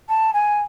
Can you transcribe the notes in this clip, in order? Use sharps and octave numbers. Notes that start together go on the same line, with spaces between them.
A5
G#5